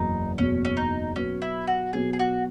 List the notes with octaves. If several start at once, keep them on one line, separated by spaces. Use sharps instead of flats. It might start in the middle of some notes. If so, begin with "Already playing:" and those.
Already playing: F#1 E2 B2 F#3 D#4
F#1 E2 B2 F#3 C#4
C#4
D#4
B2 F#3 B3 C#4
E4
F#4
B2 F#3 B3 G#4
G#4
F#4